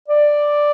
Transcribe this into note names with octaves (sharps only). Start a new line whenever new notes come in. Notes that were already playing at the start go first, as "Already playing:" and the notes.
D5